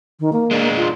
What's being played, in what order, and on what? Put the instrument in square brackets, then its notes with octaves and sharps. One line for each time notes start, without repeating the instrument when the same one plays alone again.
[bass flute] D#3
A#3
[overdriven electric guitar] G#3 D4
[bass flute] F4